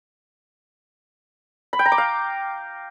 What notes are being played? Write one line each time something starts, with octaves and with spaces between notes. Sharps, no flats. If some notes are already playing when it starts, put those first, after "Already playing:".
B5
G5
A#5
D6
F5